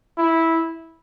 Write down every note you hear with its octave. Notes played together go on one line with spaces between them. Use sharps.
E4